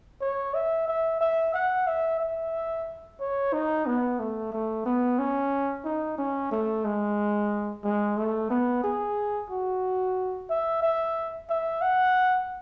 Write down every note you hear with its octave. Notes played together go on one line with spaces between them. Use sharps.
C#5
E5
E5
E5
F#5
E5
E5
C#5
D#4
B3
A3
A3
B3
C#4
D#4
C#4
A3
G#3
G#3
A3
B3
G#4
F#4
E5
E5
E5
F#5